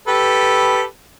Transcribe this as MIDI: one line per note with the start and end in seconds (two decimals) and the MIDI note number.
0.08 0.82 67
0.08 0.82 69
0.08 0.82 71